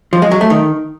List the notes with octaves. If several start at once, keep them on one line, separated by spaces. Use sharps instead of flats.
F3
G#3
F#3
A3
D#3